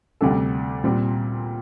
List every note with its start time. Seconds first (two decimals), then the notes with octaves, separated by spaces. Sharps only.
0.21 D2 C3 G3 D4 A4
0.84 A#2 G3 C4